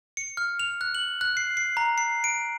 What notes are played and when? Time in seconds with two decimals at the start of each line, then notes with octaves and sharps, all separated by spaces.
0.17 C#7
0.37 F6
0.59 F7
0.81 F#6
0.95 F#7
1.21 F#6
1.37 C7
1.57 C7
1.77 A#5
1.98 C7
2.24 D7